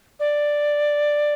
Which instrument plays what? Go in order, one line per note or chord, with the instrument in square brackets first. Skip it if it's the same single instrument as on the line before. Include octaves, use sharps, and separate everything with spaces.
[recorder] D5